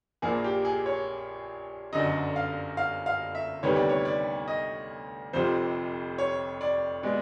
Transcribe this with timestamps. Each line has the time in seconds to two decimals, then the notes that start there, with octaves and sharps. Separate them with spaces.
0.22 A#1 A#2 F3 A#3 G#4
0.44 G4
0.65 G#4
0.86 C#5
1.93 G1 F#2 D3 F#3 D#5
2.36 F5
2.77 F5
3.06 F5
3.35 E5
3.63 D2 C3 D#3 G3 B3 C#5
3.76 D5
3.89 C#5
4.05 D5
4.48 D#5
5.33 F1 F2 C3 F3 C5
6.18 C#5
6.61 D5
7.03 B2 G#3 D5